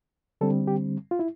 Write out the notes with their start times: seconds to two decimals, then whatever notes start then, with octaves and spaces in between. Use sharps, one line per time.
0.41 D3 G3 C4 A4
0.67 G4
1.11 F4
1.19 E4